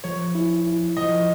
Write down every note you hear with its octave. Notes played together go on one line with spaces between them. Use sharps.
F3 C#5
E4
E4
F3 D#5